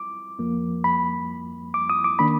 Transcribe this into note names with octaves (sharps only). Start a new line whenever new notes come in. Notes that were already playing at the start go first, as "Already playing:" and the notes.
Already playing: D6
F2 F3 A#3
B5
D6
D#6
D6
D#3 A#3 D4 B5